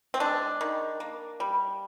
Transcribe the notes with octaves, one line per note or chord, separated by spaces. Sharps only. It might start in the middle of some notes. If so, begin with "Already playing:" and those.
C4
G#3 D4
D#3
A#3
G3